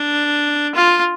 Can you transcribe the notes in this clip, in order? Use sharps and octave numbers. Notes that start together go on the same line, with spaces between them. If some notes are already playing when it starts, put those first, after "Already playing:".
Already playing: D4
F4